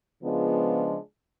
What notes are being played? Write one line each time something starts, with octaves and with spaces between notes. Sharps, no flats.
C#3 F3 G#3 B3 D4 F4